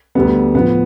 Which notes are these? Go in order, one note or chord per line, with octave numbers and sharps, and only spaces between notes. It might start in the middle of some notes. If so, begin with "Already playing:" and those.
D2 D3 G3 B3
A2 F3 B3